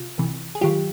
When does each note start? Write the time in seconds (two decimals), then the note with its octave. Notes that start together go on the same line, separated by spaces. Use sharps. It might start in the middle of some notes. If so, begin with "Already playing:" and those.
Already playing: C3 F4
0.18 C2 C3 E3
0.55 G#4
0.61 G2 D#3 F#3 F4 G4